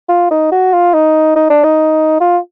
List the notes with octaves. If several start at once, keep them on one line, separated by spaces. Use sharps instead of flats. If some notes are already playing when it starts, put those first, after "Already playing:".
F4
D#4
F#4
F4
D#4
D#4
D4
D#4
F4